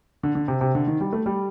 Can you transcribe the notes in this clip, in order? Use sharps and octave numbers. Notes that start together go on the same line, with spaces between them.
D3
D3
C3
C3
D3
D#3
G3
A3
G3